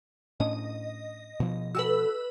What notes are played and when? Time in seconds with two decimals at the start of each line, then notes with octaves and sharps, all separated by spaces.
0.40 A2 C#4 D4 D#5
1.40 B2 F3
1.75 F#4 G4 A4 B4 E6